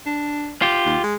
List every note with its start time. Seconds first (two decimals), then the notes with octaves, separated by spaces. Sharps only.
0.06 D4
0.62 F4 G4
0.86 D#2
1.03 G#3